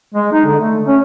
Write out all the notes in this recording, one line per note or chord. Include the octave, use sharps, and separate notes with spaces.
G#3
D#4
D3
A3
C#4